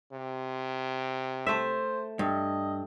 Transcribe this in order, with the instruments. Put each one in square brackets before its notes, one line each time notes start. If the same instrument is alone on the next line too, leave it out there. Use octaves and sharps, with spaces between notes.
[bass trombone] C3
[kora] A3 E5 [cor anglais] C5
[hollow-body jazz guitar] G2 [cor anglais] D#5